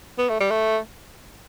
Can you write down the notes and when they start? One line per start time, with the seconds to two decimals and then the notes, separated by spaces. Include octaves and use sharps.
0.18 B3
0.29 A3
0.40 G3
0.51 A3